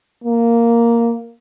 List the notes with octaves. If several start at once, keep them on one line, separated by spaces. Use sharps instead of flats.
A#3